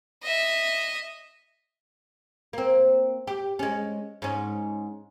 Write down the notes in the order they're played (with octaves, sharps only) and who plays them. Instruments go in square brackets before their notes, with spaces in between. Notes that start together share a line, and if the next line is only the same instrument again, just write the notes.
[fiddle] D#5 E5
[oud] A#3 C4
G4
G#3 C#4
G#2 C#4